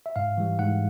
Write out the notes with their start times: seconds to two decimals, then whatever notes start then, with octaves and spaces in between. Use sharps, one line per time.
0.06 E5
0.16 G#2 F5
0.38 E3 G3
0.59 G#2 F#5